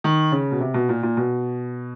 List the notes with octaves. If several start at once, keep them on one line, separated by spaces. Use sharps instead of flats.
D#3
C#3
B2
C3
B2
A#2
A#2
B2